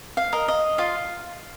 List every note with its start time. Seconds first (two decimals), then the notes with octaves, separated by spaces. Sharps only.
0.17 F5
0.33 A#4 D#5
0.48 D#5
0.78 F4 F5